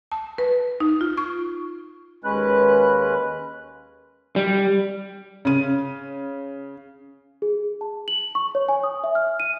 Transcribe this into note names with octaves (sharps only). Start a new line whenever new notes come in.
A5
B4
D#4
F4
C#6
D#2 G#3 C#4 B4 F#6
G3
C#3 D#7
G#4
A5
F#7
C#6
C#5
G#5
D#6
E5
F6
D#7